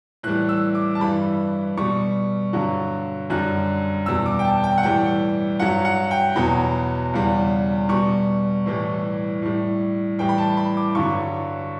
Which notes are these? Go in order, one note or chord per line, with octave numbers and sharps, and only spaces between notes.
A2 E3 G3 F#6
E6
D6
A5
G2 E3 G3 B5
B2 G3 C#6
G2 D3 F#3
F#2 D3 G3 F#6
E2 B2 G3 E6
D6
G5
A5
G5
F#5
A2 E3 G3 G5
G2 F#3 F#5
F#5
G5
E2 B2 F#3 B5
E2 C#3 G3
B2 G3 C#6
A2 E3 G3
A2 G3
A2 E3 G3 G5
B5
A5
B5
D6
G2 D3 F#3 C#6